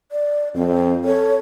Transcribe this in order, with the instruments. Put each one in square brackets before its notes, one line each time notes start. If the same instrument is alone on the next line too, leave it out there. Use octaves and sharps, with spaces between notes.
[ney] D5
[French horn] F2 [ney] C4
[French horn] A4 [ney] C#5